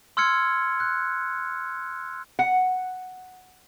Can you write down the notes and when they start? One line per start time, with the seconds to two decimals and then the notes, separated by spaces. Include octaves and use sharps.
0.17 C6 E6 F6 G#6 C#7
0.80 F#6
2.39 F#5